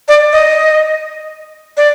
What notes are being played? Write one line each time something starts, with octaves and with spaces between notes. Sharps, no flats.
D5
D#5
D5